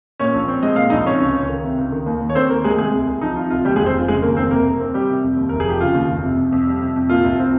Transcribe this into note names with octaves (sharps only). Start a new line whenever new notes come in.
A#2 C#4 C#5
A#1
C4
G#3 D#5
A#2 F5
A#1 D#4 D#5
C3 C#4 C#5
C#2
C#2
D#3
C3
C#2
D#3
D#2
D#2
C#5
A#3 C4 C5
D#3 A#3 A#4
D#2 G#3 G#4
C3 G#3 G#4
C2
C2
F3 D#4
C3 F4
C2 F4
D#2 G3 G4
G#3 G#4
F1
C4 C5
F1 F4
C#3 G#3 G#4
D#2 A#3 A#4
F1 C4 C5
C3 A#3 A#4
F2
C4
G3 G4
C3
F2
D#2
F1 A#4
G#4
F3 G4
C#3 F4
D#2
F1
C3
F2
F2
G3
C3
F2
A#2 F4
C2
C4